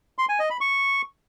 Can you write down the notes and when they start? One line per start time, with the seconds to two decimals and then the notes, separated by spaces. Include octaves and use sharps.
0.18 C6
0.29 G#5
0.40 D#5
0.50 B5
0.61 C#6